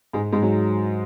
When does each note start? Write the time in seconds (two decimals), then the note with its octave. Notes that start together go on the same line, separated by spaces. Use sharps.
0.13 G#2 G#3
0.32 G#2 G#3
0.42 F#3